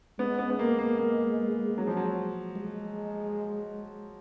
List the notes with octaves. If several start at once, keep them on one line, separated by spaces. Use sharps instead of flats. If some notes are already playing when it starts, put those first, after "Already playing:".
G#3 B3
B3
B3
A#3
A#3
A#3
F#3
F3
F#3
G#3